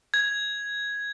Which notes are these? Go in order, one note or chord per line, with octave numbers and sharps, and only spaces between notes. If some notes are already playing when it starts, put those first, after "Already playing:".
G#6